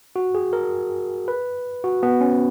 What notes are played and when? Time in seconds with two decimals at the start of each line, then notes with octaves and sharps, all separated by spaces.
0.16 F#4
0.35 G#4
0.53 A#4
1.28 B4
1.84 F#4
2.03 B3
2.21 C#4